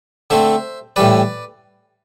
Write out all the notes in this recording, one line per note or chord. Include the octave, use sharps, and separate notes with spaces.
D3 A3 C4 C5 E5
A2 E3 G3 B4 D5